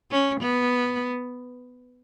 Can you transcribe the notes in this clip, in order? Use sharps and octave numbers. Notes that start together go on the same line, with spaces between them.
C#4
B3